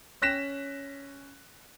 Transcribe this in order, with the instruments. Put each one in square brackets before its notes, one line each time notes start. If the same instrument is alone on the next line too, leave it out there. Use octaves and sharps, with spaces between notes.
[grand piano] C#4 F#6 A#6 B6 E7